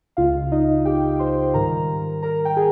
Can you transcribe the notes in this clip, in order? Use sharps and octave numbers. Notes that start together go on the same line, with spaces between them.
C#2 C#3 G#3 F4 F5
D#4 D#5
G4 G5
C5 C6
G#2 D#3 G3 A#4 A#5
A#4 A#5
G5
G#4 G#5